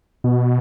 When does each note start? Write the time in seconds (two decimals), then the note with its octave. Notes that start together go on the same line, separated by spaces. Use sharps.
0.24 B2